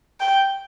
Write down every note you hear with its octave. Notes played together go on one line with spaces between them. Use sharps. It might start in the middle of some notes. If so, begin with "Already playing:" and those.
G5